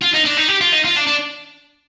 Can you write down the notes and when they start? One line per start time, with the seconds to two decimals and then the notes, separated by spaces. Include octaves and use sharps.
0.02 F4
0.14 D#4
0.25 D4
0.37 D#4
0.48 G4
0.61 F4
0.72 D#4
0.85 F4
0.96 D4
1.07 D4